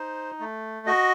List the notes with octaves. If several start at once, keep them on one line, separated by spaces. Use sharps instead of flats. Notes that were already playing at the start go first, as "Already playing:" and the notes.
Already playing: D#4 C5
A3
F#4 D#5